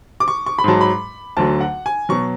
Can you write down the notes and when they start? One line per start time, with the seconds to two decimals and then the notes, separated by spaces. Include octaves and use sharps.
0.20 D6
0.28 C#6
0.46 C#6
0.59 B5
0.64 G#2 F#3 A5
0.81 B5
1.37 D2 D3 F#3 A5
1.61 F#5
1.86 G#5
2.09 B2 F#3 C#6